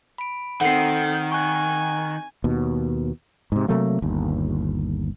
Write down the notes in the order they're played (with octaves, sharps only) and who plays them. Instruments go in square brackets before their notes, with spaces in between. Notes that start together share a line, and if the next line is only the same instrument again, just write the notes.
[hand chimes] B5 D7
[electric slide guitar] D#3 [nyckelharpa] C4 [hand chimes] A4 [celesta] F#5 C7
[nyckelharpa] G#5 [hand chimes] C#6 F#6
[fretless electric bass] D#2 B2
G#2 C3
C3 F#3 A3 A#3
G1 D#2